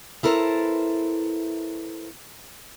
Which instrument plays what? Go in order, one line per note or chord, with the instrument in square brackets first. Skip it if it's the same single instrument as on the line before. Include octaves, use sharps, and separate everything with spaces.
[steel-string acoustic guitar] B3 E4 A4 A#4 C5 A5